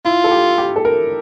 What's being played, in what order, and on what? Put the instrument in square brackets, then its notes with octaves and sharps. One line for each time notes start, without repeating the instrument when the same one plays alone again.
[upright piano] E4 [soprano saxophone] F4
[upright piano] A4
G4
G4
A4
A#4